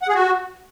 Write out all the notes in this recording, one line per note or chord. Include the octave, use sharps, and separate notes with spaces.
F#5
G#4
F#4